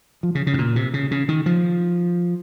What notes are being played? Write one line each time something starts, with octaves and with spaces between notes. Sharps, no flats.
F3
C#3
C#3
G#2
A#2
C3
C#3
C#3
D#3
F3